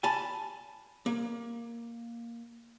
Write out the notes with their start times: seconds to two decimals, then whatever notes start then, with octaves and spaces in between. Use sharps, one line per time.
0.03 G#5 A5 B5
1.06 A#3